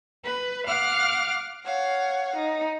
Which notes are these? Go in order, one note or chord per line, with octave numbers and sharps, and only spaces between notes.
B4
F5 F#5 D6 F6
C#5 F5 F#5
D#4